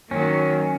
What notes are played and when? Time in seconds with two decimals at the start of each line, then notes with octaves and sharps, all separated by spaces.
0.11 D#3 F#3 A#3 C#4